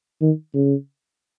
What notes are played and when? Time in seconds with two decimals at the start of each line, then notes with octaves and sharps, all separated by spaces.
0.21 D#3
0.54 C#3